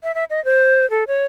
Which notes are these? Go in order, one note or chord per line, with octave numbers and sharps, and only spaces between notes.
E5
E5
D#5
C5
A4
C#5